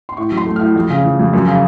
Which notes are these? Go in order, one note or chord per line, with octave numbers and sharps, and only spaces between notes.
C6
A2 C#6
F#3
C6
A3
F6
A2
F2
C#3
F3
F2
F#2
C#3